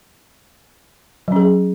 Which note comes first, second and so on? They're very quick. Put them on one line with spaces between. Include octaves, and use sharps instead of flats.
F#3 C#4 G#4